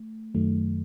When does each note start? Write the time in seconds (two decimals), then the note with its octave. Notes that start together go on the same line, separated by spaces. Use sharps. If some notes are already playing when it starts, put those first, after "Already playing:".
Already playing: A3
0.35 F#2 D#3 F#3 A3